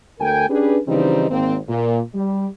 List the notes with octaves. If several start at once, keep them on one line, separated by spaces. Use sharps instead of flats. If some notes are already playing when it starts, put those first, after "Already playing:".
D2 A3 A#4 G5 G#5
C#4 D4 G4 G#4 B4
C#3 E3 F3 G3 C4 D#4
G#1 A#3 C4
A#2
G3